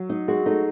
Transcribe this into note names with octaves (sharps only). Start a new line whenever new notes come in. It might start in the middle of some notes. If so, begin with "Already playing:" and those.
Already playing: F#3
D#4
G#3 F#4
A3 D#4